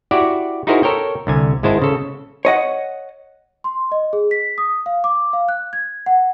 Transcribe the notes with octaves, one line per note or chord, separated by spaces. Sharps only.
E4 F#4 G4 D5 F#5
D#4 E4 F#4 G#4 A#4 C5
A4 A#4 C#5 G5
C2 D3 G#5
G#1 G#3 E4 C5 A5
C#3 A4
C#5 D#5 F#5
C6
D#5
G#4
B6
D#6
F5
D6
F5
F#6
G#6
F#5